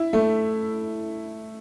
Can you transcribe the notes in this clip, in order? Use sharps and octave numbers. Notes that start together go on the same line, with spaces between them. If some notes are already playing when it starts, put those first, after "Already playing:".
Already playing: E4
A3